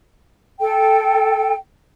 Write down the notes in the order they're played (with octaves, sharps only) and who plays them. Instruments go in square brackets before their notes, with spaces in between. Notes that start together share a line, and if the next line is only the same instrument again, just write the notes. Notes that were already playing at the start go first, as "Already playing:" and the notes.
[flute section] A4 G5